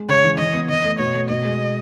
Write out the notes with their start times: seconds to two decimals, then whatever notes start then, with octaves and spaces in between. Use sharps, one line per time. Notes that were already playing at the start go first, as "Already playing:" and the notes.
Already playing: G#3
0.09 C#3 C#5
0.24 E3
0.38 E3 D#5
0.54 B3
0.70 E3 D#5
0.85 A3
0.99 B2 C#5
1.14 A3
1.29 B2 D#5
1.45 G#3